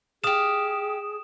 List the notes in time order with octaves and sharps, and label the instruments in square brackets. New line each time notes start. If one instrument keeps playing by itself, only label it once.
[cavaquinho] G4 F5 [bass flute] G#4 [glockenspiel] D#6 E7